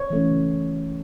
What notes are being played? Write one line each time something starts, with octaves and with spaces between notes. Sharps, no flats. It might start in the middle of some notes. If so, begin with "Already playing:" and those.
Already playing: C#5
E3 A3 C#4
C#3